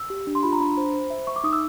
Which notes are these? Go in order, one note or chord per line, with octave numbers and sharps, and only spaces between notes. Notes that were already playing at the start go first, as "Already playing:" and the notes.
Already playing: E6
G4
D4
C6
F4 B5
A#5
D4 B5
C5
C5
E5
E5 C#6
D6
D#4 D#6
E6